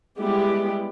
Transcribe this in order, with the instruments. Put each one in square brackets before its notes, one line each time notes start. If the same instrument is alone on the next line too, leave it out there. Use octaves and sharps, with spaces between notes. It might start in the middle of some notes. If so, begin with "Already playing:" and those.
[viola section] G3 G#3 B3 E4 G4